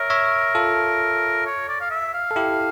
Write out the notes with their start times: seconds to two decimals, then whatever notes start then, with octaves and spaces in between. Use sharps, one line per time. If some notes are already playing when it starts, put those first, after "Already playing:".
Already playing: A#4 C#5 E5
0.10 C#5 E5
0.55 F4 A4
1.46 C#5
1.69 D5
1.81 F5
1.91 E5
2.14 F5
2.31 A4
2.36 E4 G4